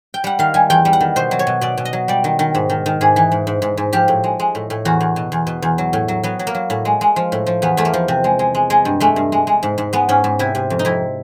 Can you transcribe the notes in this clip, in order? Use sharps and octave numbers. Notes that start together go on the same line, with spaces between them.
G5
G3 F#5
D#3 F5
G3 G#5
E2 G5
G3
F#5
D#3
B2 C5
F#3
C#5
B2
B2 D5
B2
D#5
F#3
G3 D5
D#3
D#3
G#2
D#3
D#3
G#2 G#4
E3
G#2
G#2
G#2
G#2
F3 G4
A2
G#3
G#3
A2
A2
E2 F#4
E2
B2
E2
B2
E2
F#3
A2
F#3
F#3 B3
F#3
A#3
F#3
A2
G#3
G#3
F3
A2
F3
E2 B3
E2 A3
A#3
F3
C3
G#3
G#3
G#3
G#3
G2
G#3 A3
G2
G#3
G#3
G#2
G#2
G#3 B3
G#2 C#4
G#2
C3 E4
C3
F2
D#4
F2 E4